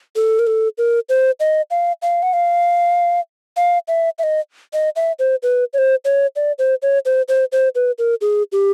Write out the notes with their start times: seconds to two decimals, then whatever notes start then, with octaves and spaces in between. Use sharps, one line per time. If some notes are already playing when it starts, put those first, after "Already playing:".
0.16 A4
0.39 A#4
0.47 A4
0.78 A#4
1.09 C5
1.40 D#5
1.71 F5
2.02 F5
2.23 F#5
2.33 F5
3.57 F5
3.88 E5
4.19 E5
4.23 D#5
4.73 D#5
4.96 E5
5.19 C5
5.43 B4
5.73 C#5
5.78 C5
6.05 C#5
6.36 D5
6.59 C5
6.82 C#5
7.06 C5
7.28 C5
7.52 C5
7.75 B4
7.98 A#4
8.21 G#4
8.52 G4